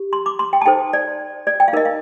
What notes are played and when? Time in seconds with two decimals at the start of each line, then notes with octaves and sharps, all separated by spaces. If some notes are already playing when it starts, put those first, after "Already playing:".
Already playing: G4
0.13 C6
0.26 D6
0.39 C6
0.53 G5
0.61 A5
0.66 D#4 A4 C5 G5
0.93 D5
1.47 D5
1.60 G5
1.68 F5
1.73 D#4 A#4 D#5
1.85 F5